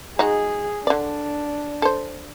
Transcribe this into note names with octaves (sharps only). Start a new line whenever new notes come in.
G#3 D#4 F#4 G#4
D3 D4 D5
A4 C5